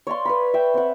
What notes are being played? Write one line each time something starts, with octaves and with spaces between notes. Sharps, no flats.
C#5 D5 F5 C6
B4 F5 B5
E5 G5
C4 F#5